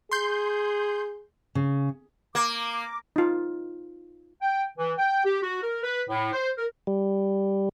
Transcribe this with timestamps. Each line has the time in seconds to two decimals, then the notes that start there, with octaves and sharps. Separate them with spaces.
0.12 G#4 C6 G6
1.55 C#3
2.35 A#3 D6
3.16 D#4 F4
4.42 G5
4.78 E3
4.98 G5
5.25 G4
5.43 F#4
5.63 A#4
5.83 B4
6.09 A2
6.33 C5
6.58 A#4
6.87 G3